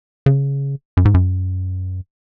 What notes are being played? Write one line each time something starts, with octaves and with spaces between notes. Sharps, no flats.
C#3
F#2
G#2
F#2